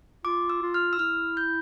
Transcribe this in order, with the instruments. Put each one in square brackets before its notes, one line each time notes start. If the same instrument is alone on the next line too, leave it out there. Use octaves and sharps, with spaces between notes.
[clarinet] F4 [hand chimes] D6
[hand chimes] E6
[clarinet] F4
[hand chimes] F6
E6
[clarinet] E4 [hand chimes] F6
[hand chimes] G6